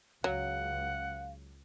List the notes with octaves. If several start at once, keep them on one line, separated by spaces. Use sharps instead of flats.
C#2 F#3 F5 F#5